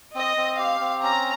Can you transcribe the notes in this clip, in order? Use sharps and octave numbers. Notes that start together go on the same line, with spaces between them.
C4 D#5
C4
G4 F5
C4
C#4 A#5